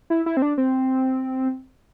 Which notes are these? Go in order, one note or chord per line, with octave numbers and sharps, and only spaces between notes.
E4
E4
C4
D4
C4